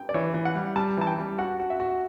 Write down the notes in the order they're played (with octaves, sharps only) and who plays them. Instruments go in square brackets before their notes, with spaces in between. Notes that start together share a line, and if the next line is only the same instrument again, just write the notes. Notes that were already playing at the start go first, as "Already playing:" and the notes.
Already playing: [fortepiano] G5
D5
[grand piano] E3 [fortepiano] C#5
[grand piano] E3
[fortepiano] F#5
[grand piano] G3
[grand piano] G3 [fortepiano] A5
[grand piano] E3 [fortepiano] A5
[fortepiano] G5
[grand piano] G3
[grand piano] F#4 [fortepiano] F#5
[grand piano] F#4
[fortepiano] E5
[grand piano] F#4